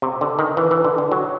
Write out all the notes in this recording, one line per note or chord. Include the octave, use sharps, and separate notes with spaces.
C3
D3
D#3
E3
E3
D3
D3
F#3